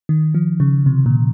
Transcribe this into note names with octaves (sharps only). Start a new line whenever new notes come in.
D#3
F3
C#3
C3
A#2